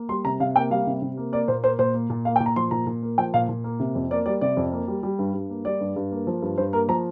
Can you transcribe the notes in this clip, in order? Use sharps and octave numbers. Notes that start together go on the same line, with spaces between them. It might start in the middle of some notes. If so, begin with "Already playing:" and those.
Already playing: A#3
G3 C6
C3 A#5
C3 F5
A#3 G5
G3 F5
C3
C3
A#3
A#3 D5
A#2 C5
A#3 C5
A#2 C5
A#3
A#2
A#3 F5
G5
A#2
A#5
F3 C6
A#2 A#5
A#2
A#3
F3 G5
A#2 F5
A#2
A#3
C3
F2
A#3 D5
G3 D5
C3 D5
F2
A#3
G3
G3
G2
G2
A#3
G3 D5
G2
G2
A#3
F3
G2
G2 C5
A#3 A#4
F3 A#5